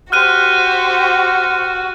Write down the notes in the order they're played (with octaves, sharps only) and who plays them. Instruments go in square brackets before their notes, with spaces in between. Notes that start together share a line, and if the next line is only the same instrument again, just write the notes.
[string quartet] F#4 [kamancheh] G4 C5 [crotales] F6 F#6 D#7